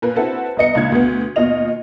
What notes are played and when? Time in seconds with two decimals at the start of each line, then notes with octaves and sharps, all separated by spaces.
0.02 A#2 A#3 B4
0.16 C4 E4 F#4 A4 B4
0.57 C2 B3 D#5 C#7
0.75 C#2 A#2 D#4 G#6
0.92 D2 B2 B3
1.36 D#2 B2 F4 D#5 F7